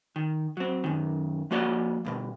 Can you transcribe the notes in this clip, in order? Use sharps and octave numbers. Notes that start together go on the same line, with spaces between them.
D#3
F#3 C4
F#2 D#3
F3 A#3 F#4 C#5 D5
C#2 G2 B2